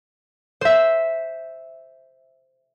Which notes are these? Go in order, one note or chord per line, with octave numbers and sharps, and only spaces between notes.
C5 E5